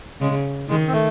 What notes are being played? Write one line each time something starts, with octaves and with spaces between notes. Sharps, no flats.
C#3 G#3
D#3 G#3
C4
A3